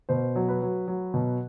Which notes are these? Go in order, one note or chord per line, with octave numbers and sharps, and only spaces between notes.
B2 C5
F#3
B4
F#3
F#3
B2